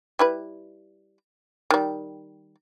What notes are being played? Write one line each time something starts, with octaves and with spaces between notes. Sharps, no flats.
G3 E4 B4
D#3 G3